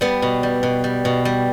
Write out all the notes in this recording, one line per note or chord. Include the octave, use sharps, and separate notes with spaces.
G3 B3
B2
G3
B2
G3
B2
G3